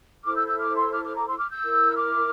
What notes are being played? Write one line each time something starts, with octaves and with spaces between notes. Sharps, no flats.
E4 A4 C5 D6 F6
E6 G6
E6 G6
D6 F6
C6 E6
D6 F6
D6 F6
A#5 D6
C6 E6
D6 F6
E6 G6
E4 A#4
D6 F6